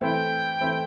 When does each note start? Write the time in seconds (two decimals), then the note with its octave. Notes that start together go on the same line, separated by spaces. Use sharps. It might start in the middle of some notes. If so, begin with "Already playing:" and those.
0.01 E3 A3 C4 E4 G5
0.61 E3 A3 C4 E4